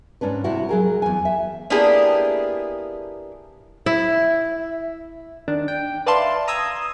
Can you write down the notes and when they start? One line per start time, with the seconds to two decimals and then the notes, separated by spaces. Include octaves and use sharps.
0.21 G#2 C#4 D4 B4
0.44 C3 E4 F#4
0.69 F#3 G#4 A#4
1.02 E2 G#5
1.25 E5
1.70 A#3 B3 D4 E4 G4 G#4
3.86 E4 E5
5.48 D#3 D4
5.68 G5
6.06 B4 D5 E5 F5 A5 C6
6.48 A#5 D#6 E6 G#6